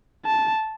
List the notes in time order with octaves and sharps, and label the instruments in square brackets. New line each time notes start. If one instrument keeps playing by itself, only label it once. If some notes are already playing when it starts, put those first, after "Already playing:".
[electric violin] A5